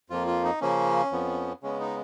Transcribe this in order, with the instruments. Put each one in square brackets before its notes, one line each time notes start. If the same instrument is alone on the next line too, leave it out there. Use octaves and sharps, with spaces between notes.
[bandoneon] F2 F3 A#3 F4
F4
D#4
C#3 F3 A#3 C#4
F2 F3 B3
C#3 G#3 B3 C#4
D#4